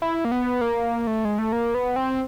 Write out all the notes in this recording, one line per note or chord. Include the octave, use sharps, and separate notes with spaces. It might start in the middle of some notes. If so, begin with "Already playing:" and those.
E4
A#3
B3
A#3
A3
G#3
A3
A#3
B3
C4